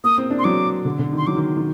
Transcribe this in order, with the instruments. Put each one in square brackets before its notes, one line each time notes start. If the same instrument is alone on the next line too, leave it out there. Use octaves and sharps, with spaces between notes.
[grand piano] A#3 [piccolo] D#6
[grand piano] C4
D4
[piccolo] C6
[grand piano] F#3 [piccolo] D6
[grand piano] D3
D3
[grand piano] D#3 [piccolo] C6
[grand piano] F#3 [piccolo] D6
[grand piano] D#3
D#3